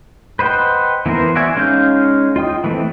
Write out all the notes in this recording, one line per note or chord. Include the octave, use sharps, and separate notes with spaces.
B4 C5 D#5 F#5 G5
E3 B3 A#4 C5
F#4 D5 E5 G#5
G#3 C#4 D#4 F5 G6
F4 D#5 G5 D#6
E3 A3 C4